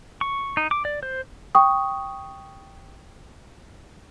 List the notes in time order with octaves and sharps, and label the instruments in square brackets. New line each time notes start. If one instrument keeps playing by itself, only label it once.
[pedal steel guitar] C#6
D#4
D6
D5
C5
[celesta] G5 C#6 D#6